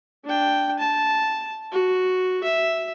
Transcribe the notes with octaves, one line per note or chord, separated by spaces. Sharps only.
D4 G5
A5
F#4
E5